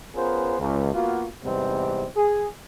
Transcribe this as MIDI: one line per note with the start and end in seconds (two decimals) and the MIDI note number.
0.15 0.56 59
0.15 0.56 61
0.15 0.56 65
0.15 0.56 68
0.15 0.56 70
0.15 0.56 72
0.59 0.90 37
0.94 1.27 58
0.94 1.27 59
0.94 1.27 65
0.94 1.27 66
1.44 2.07 40
1.44 2.07 44
1.44 2.07 48
1.44 2.07 55
1.44 2.07 59
1.44 2.07 60
2.16 2.46 68